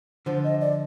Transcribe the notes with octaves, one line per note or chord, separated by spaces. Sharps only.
D3 F3 C5
D#5
D5